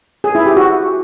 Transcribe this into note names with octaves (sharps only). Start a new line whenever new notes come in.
G#4
E4
G4
F#4